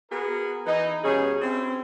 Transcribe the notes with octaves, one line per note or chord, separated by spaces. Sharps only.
B3 F#4 G#4 A#4
E3 D#4
B2 G3 C#4 G#4
C4 C#4 E4